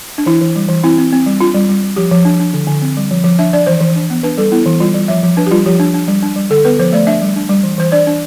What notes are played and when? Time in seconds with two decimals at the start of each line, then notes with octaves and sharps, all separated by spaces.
0.18 D4
0.26 E3 E4
0.41 E3
0.56 G3
0.69 E3
0.84 C4 E4
0.98 C4
1.13 C4
1.26 G3
1.41 D4 F4
1.55 G3
1.69 G3
1.83 G3
1.96 F3 G4
2.11 F3
2.25 D4
2.40 D4
2.54 D3
2.67 D3
2.82 C4
2.97 G3
3.11 F3
3.24 F3
3.39 D4 E5
3.53 D4 D5
3.66 E3 C5
3.81 E3
3.96 D4
4.10 B3
4.23 D4 B4
4.38 G3 A4
4.52 B3 E4
4.66 E3
4.80 G3 F4
4.94 G3
5.08 F3 E5
5.23 F3
5.37 D4 B4
5.47 G4
5.51 G3 F4
5.66 F3 G4
5.80 D4
5.94 D4
6.08 G3
6.23 D4
6.36 G3
6.50 D3 A4
6.65 B3 B4
6.79 F3 C5
6.93 A3 D5
7.07 D4 E5
7.22 G3
7.36 D4
7.49 G3
7.63 E3
7.78 E3 C5
7.92 D4 D5
8.07 D4